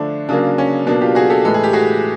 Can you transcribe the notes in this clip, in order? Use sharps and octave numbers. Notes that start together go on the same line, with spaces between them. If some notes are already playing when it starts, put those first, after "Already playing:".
Already playing: D3 F3 A3 D4
C#3 F#3 A#3 D4
C#4
B2 F#3 A#3 D4
F4 G4
F#4 G#4
G4 A4
A2 E3 G#3 A4
G#4
G4
F#4 G#4